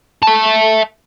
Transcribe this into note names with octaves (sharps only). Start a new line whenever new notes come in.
E5 A5